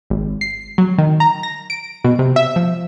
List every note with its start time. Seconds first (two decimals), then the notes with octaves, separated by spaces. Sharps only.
0.10 G#1
0.41 C7
0.78 F#3
0.98 D#3
1.20 A#5
1.43 A#6
1.70 D7
2.04 B2
2.19 C3
2.36 E5
2.56 F3